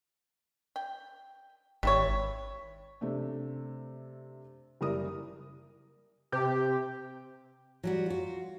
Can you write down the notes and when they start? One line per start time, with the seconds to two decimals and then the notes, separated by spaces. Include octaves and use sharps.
0.76 G5
1.83 G#1 G3 E4 C#5
3.01 C3 A3 D4
4.81 F#1 G3 E4 A#4 D5 D#6
6.32 C3 G4
7.83 F#3 G3 F#4
8.06 F4 F#4